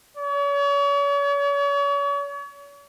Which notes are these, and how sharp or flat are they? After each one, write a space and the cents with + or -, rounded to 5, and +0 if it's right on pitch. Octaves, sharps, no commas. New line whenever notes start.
C#5 +40